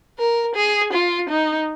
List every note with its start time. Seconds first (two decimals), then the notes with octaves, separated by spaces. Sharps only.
0.18 A#4
0.56 G#4
0.93 F4
1.30 D#4